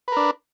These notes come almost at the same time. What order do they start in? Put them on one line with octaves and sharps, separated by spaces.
B4 A#4 D4